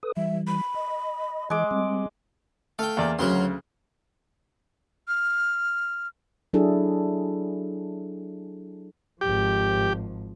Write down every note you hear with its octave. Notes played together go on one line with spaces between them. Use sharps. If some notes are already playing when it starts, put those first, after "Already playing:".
A4 B4 D#6
E3 G3 E5
B5
D#5
E3 G#3 D6
G3 C4
A3 F5 G5
E2 A#3 D5
D2 C#3 F#3 A#4 C6
F6
F#3 D4 E4 G#4 A4
G#1 F3 G4